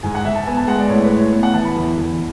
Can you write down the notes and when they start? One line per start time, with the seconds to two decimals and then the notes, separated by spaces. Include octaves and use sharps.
0.03 G#2 G#5
0.15 F#5
0.25 G#2 E5
0.35 A5
0.46 B3 G#5
0.57 A5
0.67 G#3 F#5
0.79 D5
0.89 A2 C#5
1.04 B4
1.11 A2
1.18 C#5
1.32 B3
1.43 F#5
1.54 E3 A5
1.65 B5
1.76 E2
1.97 E2